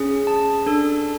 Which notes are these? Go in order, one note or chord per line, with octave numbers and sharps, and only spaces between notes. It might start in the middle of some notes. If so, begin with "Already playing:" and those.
Already playing: C#4 G#4
A5
D4 A4